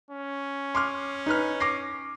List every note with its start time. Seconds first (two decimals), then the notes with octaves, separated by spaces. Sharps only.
0.10 C#4
0.75 C6 D6 F6
1.26 D#4 B4 F6
1.60 D6 A#6 C7